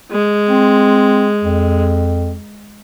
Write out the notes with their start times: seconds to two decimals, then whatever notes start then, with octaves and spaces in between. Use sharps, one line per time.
0.11 G#3
0.49 C4
1.43 F2